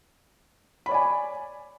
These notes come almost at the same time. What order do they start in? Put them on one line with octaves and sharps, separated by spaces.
B5 C#5 D5 G#5